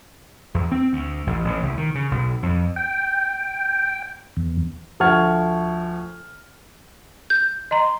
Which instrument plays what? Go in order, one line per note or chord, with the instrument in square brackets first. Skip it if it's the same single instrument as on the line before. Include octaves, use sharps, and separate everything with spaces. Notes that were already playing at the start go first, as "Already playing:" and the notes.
[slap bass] E2
C4
D2
A1
A1
C2
D#3
C#3
B1
F2
[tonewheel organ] G5
E2
[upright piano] D2 F3 F#5 C#6 F6 G#6
[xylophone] G6
[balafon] D#5 A#5 [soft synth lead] C6